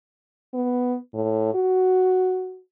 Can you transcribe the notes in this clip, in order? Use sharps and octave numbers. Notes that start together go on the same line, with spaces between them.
B3
A2
F#4